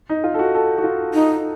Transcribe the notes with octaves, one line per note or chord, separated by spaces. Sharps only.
D#4
F4
A4
F#4
A4
F#4
F4
D#4